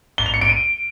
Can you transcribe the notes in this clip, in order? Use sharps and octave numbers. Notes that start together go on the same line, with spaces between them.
G7
F7
C#7
D7
D#7